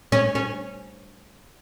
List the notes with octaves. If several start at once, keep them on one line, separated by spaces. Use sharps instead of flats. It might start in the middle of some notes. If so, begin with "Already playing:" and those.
C#4
C#4